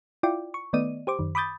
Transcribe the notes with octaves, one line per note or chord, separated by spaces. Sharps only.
E4 F4 D5 G5 D6
C#6
D#3 A3 B3 D5 D#5 D#7
G4 C5 D6
F#2 D#3
B5 D6 D#6 G6 A6